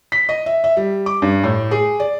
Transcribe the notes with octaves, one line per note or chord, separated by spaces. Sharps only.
B6
D#5
E5
E5
G3
D6
G2
A2
G#4
D5